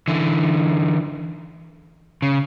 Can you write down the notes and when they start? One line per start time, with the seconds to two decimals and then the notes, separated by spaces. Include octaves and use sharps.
0.08 D3 E3
2.22 C#3